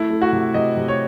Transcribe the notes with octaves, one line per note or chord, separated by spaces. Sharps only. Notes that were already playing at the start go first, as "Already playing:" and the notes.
Already playing: A3 E4
A3
F#4
C3
C3 D#5
C3
C#5